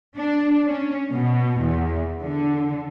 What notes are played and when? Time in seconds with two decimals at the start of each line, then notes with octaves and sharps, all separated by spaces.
0.18 D4
0.68 C#4
1.12 B2
1.61 E2
2.22 D3